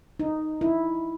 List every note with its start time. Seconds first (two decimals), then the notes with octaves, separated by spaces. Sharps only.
0.20 D#4
0.61 E4